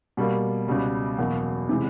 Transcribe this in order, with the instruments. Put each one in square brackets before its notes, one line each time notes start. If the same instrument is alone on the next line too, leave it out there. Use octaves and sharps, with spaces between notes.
[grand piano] B2 G3 A#3
C#2 B2 G3
E2 B2 F#3 A#3
C3 E3 G#3